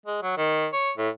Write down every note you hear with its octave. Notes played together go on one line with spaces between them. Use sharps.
G#3
F#3
D#3
C#5
A2